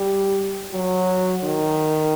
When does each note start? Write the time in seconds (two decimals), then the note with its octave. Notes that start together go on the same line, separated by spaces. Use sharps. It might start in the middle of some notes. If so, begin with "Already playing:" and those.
Already playing: G3
0.72 F#3
1.44 D#3